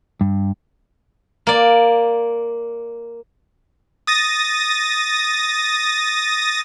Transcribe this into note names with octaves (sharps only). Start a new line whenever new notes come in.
G2
A#3 D5
D#6 A6 A#6